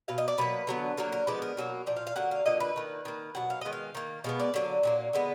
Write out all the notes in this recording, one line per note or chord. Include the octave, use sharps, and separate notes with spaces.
B2 F#3 F5
D#5
D5
B2 F#3 A#3 B4
D3 F#3 B3
D3 F#3 A#3 A#4
A#4
D3 F3 G#3 B3 D5
A#4
B2 F#3 A#3
A#2 F3 D5
F5
F5
D3 F#3 A#3 F#5
F5
D3 F3 A#3 D#5
B4
D#3 A#3
D#3 A#3
B2 F#3 F#5
F5
D#3 G#3 B3 D#5
F5
D#3 A#3
B2 G#3 B3 F5
D5
D3 F#3 A#3
A#2 F#3 A#3
D3 G#3 B3